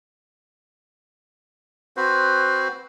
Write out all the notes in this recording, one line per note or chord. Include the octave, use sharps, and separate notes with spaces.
C4 F#4 B4 C5